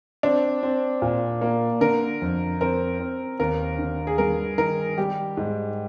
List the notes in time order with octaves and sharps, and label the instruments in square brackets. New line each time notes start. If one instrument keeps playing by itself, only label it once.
[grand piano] C4 [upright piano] D4
[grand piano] C4
A#2
A#3
[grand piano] D3 [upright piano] A#4
[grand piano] F2
[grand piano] C4 [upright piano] A#4
[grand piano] C4
[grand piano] D#2 [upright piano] A#4
[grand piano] D3
[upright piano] G#4
[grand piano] G2 [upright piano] A#4
[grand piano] D#3 [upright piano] A#4
[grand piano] G3 [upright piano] G4
[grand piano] G#2